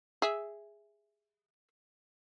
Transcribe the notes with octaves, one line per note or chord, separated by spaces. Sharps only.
G#4 E5